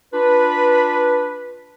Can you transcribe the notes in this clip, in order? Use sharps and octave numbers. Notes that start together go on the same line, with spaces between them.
D4 F4 B4